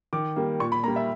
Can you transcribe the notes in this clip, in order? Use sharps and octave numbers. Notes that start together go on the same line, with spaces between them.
D#3 D6
G3 A#3
A#2 C#6
B5
G3 A#3 A#5
E5